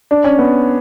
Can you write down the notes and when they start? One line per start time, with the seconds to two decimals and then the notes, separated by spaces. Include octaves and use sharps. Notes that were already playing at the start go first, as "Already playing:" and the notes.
0.11 D4
0.24 C#4
0.39 B3